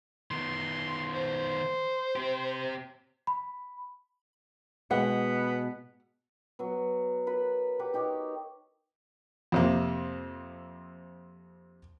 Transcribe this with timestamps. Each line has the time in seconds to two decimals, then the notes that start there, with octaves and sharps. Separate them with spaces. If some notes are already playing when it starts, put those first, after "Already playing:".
0.31 D#3 B3 C6
1.15 C5
2.16 C4 G4
3.27 B5
4.91 B2 G#3 B3 F#5
6.59 F#3 B3
7.27 A#4 B4 B5
7.79 G4 B4 F#5 D6
7.94 D#4 G4 A#4 C#5
9.52 F2 C3 A#3